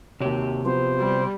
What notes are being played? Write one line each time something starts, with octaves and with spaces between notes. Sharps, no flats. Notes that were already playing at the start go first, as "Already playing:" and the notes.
D#2 C3 F#4 G4 C#5
F3 B3 F#4 C5
G3